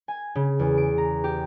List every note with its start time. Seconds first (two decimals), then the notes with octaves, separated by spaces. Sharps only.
0.08 G#5
0.35 C#3
0.59 E2
0.78 D7
0.98 A#5
1.24 G4